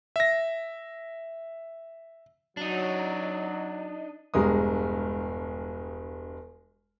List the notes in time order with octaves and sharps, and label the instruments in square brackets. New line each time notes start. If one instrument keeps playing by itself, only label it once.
[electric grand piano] E5 A#6
[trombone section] F#3 [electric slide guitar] D4 D#4
[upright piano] E1 G2 G#3 A#4 D#6